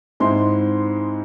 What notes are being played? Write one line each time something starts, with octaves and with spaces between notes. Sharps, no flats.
G#2 G#3 C4 E4 C6